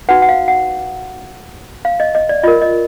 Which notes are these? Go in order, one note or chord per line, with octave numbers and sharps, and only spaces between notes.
D#4 F#4 B4 F#5
F#5
F5
F#5
F5
D#5
D#5
D5
F4 A#4 D#5
D#5